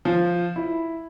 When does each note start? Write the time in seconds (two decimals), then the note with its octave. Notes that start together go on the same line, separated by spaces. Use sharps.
0.05 F3
0.56 E4